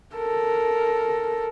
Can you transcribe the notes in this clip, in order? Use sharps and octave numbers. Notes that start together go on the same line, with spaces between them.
A4 A#4